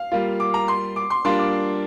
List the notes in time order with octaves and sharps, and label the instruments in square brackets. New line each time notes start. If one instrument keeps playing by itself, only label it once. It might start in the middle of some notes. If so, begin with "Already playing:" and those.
Already playing: [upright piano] F5
[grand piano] G3 A#3 F4
[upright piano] D6
A#5
C6
D6
C6
[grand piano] G3 A#3 D4 F4 [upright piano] C6
[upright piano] D6